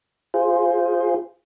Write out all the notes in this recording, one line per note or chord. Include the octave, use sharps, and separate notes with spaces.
F4 G#4 C5